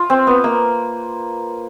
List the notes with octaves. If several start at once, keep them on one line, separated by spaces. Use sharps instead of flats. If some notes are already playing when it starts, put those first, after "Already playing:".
Already playing: F4
C4
B3
A#3